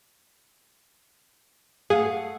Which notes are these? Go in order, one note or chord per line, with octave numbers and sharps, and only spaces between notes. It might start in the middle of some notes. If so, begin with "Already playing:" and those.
A3 G#4 F5 F#5